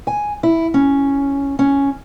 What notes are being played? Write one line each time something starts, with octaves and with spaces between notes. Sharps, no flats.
G#5
E4
C#4
C#4